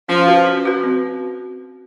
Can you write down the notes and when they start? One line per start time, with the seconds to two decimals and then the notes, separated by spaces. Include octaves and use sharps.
0.09 F3 C#4
0.27 F#4 B4
0.47 C#4
0.65 F#4 B4
0.83 C4